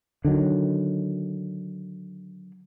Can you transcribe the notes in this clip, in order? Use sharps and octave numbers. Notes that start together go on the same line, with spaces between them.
D3 D#3 F#3